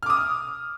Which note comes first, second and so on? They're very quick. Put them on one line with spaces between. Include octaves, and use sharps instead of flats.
F6 D6 D#6